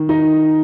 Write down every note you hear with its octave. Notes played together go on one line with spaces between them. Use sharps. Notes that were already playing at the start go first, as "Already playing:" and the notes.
Already playing: D#3
D#4